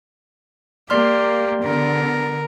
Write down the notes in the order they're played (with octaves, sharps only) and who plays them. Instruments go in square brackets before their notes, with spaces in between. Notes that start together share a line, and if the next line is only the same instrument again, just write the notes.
[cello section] A#3 [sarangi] G4 [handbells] D5 C6 F6
[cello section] D3 B3 [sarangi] A#4